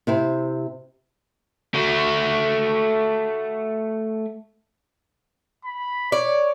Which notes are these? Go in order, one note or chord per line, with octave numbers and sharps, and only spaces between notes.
C3 E4 C5
A3 F#4
B5
C#5 D5